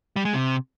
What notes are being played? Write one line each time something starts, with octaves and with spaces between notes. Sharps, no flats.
G3
G#3
C3